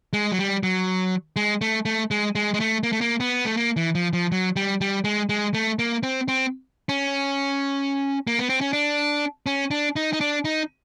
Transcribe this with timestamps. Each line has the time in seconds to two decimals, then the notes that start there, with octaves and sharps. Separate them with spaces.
0.13 G#3
0.32 F#3
0.39 G3
0.63 F#3
1.36 G#3
1.61 A3
1.85 A3
2.11 G#3
2.35 G#3
2.54 G#3
2.60 A3
2.83 A#3
2.92 A3
3.01 A#3
3.20 B3
3.45 A3
3.57 A#3
3.76 E3
3.95 F3
4.13 F3
4.32 F#3
4.56 G3
4.81 G3
5.04 G#3
5.29 G#3
5.54 A3
5.79 A#3
6.03 C4
6.28 C4
6.89 C#4
8.27 A#3
8.39 B3
8.49 C4
8.61 C#4
8.73 D4
9.46 C#4
9.71 D4
9.96 D#4
10.13 D#4
10.20 D4
10.45 D#4